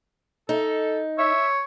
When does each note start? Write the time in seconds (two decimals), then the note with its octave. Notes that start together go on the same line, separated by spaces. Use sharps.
0.49 D#4 A4
1.18 C#5 E5